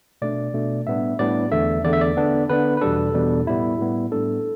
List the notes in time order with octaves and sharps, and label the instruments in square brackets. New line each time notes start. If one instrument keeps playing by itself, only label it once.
[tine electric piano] B2 A3 D4 D5
B2 A3 D4
A2 G3 B3 D4 E5
A2 G3 B3 D4 D5
E2 D3 A3 E5
E2 D3 A3 D5
E5
D5
D3 B3 D4
D3 B3 D4 B4
B4
E2 B2 G3 D4 A4
E2 B2 G3 D4
A2 G3 B3 E4
A2 G3 B3
A2 G3 B3 D4 A4